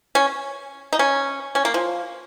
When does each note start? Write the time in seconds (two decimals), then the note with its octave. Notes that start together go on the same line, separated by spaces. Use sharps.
0.15 C#4
0.93 D#4
0.99 C#4
1.55 C#4
1.65 A#3
1.74 F3